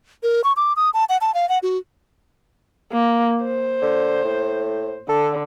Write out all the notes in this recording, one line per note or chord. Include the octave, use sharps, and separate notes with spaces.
A#4
C#6
D6
D#6
A5
F#5
A5
F5
F#5
F#4
A#3
C5
D3
A2
D3 A4